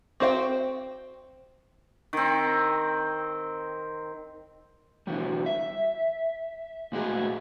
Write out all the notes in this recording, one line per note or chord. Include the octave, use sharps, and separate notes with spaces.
C4 F#4 C5 E5 G5
D#3 C4
B2 D3 E3 F#3 G3
E5
A#2 G#3 A3 F#4 G#4